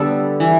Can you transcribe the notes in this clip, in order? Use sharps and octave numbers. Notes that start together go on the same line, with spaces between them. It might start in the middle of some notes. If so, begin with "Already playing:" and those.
Already playing: D3 G3 B3 A4 B4
E3